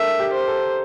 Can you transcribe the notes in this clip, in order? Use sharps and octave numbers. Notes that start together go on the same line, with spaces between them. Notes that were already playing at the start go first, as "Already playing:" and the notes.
Already playing: D4 A4 A#4 E5
G4
C5
A4